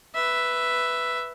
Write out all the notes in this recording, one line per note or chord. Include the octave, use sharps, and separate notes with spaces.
B4 E5